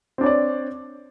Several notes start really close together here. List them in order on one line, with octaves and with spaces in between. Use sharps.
C4 D4 C#5 D5